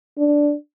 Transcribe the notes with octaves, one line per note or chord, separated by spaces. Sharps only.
D4